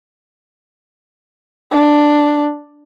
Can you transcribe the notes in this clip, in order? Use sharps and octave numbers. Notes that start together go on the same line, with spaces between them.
D4